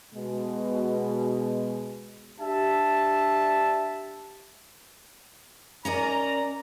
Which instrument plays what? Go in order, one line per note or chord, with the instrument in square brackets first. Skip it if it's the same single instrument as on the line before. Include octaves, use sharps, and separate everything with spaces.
[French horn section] B2 G#3
[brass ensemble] D4 G4 E5 A5
[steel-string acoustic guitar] C#4 A#4 D#5 [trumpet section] D5 A#5